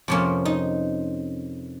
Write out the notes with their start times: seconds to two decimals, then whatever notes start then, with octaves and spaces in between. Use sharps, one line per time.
0.08 F2 C3 F3 A#3 C#4
0.45 D#4